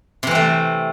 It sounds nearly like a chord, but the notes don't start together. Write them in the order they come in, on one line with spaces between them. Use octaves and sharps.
C3 E3 C4 A3